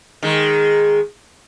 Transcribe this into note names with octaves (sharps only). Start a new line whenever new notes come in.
D#3 G#3